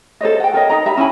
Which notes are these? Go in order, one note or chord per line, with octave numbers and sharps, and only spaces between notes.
A4 C5 C#5 D#5
F#5 G5
A4 A#4 C#5 D#5
D#4 D#5 A#5
G4 E5 A#5 B5
C#4 E4 G#5 B5